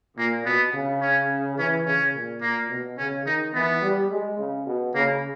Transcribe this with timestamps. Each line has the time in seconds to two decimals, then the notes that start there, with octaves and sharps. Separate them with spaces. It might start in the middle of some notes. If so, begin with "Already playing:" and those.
0.17 A#2 A#3
0.45 B2 B3
0.74 C#3
1.01 C#4
1.58 E3 C#4
1.86 C#3 C#4
2.14 A#2
2.41 A#2 A#3
2.70 B2
2.98 C#3 C#4
3.26 D#3 D#4
3.54 E3 B3
3.82 G3
4.10 G#3
4.38 C#3
4.66 B2
4.94 C#3 A#3